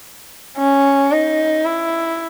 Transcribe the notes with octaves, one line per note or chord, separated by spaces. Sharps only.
C#4
D#4
E4